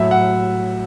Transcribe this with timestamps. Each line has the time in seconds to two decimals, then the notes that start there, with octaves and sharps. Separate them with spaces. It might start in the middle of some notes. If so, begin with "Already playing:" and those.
Already playing: A2 F#3 E5
0.11 F#5